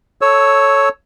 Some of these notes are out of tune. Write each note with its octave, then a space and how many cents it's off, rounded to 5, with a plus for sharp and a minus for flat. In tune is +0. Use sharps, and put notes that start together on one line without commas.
A4 +0 C#5 +0 E6 -15